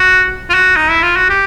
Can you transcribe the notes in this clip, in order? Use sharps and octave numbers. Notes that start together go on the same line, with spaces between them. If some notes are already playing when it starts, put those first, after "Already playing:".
Already playing: F#4
F4
F#4
D#4
E4
F4
F#4
G4